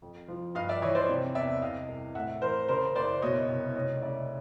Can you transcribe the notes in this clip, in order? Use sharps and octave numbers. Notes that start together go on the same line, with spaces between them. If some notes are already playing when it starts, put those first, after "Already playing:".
F2
F3
G2 D#5 F5
D5 E5
E3 C#5 D#5
C5 D5
C3
E2 D5 E5
C2 D#5 F5
C2
A2 E5 F#5
E3 A#4 C5
C#3 A#4 C5
F#1 C5 D5
B2 C#5 D#5
C2
F1 C#5 D#5
C#3 D5 E5